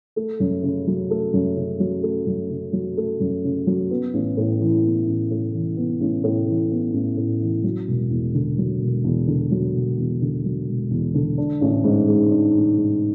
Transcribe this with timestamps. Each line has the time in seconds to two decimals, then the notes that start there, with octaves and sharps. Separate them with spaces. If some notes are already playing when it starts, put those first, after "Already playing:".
0.16 A3
0.40 F#2
0.63 C#3
0.87 F#3
1.10 A3
1.33 F#2
1.56 C#3
1.80 F#3
2.03 A3
2.26 F#2
2.50 C#3
2.73 F#3
2.97 A3
3.20 F#2
3.44 C#3
3.67 F#3
3.90 B3
4.14 A1
4.37 A2
4.60 E3
4.83 B3
5.08 A1
5.31 A2
5.54 E3
5.77 B3
6.01 A1
6.24 A2
6.48 E3
6.71 B3
6.93 A1
7.17 A2
7.41 E3
7.64 F#3
7.88 E1
8.11 E2
8.34 D3
8.58 F#3
8.81 E1
9.04 E2
9.28 D3
9.51 F#3
9.75 E1
9.98 E2
10.21 D3
10.45 F#3
10.68 E1
10.91 E2
11.14 D3
11.38 D4
11.61 A1
11.84 G#2
12.08 G#3
12.31 D4
12.54 A1
12.78 G#2